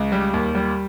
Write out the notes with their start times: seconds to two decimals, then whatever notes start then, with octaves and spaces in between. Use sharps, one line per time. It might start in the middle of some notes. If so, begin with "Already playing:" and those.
Already playing: C#2
0.12 G3
0.34 D#2
0.55 G3